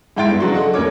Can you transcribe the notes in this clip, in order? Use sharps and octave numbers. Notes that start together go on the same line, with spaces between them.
G#2 E4 G5 C6 A6 D7
G2 B3
C#3 F#3 D4 F#4 C6
A4 D#5 F#5
F1 D#2 C#4 A#4 C#5 D6